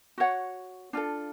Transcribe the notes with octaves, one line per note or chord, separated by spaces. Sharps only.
F#4 C#5 F#5
D4 F4 A4